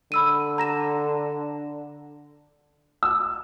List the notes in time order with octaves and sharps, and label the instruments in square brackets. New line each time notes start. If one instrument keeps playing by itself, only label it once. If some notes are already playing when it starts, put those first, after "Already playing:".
[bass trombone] D3 [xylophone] B5 E6 D#7
[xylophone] A#5 A#6 E7
[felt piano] E6